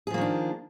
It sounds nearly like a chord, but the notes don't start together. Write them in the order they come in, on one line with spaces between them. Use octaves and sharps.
G#4 F3 A#3 D#3 D4